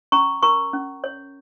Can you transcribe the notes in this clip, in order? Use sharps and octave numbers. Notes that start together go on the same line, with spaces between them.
C#4 A#5 C#6
A#4 A#5 C#6
C#4
C#5